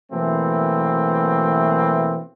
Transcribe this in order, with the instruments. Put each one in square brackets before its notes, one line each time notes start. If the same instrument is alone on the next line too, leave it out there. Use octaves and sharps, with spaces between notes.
[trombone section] B2 E3 F#3 A3 A#3 C4